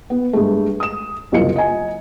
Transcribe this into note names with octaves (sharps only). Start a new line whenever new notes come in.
B3
G2 G#3 A3
D#6 E7
F#1 C2 F#2 F4 F#4 C#7
D#5 G#5